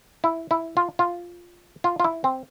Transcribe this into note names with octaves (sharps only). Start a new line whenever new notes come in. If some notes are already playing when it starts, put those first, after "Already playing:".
E4
E4
F4
F4
F4
F4
E4
C4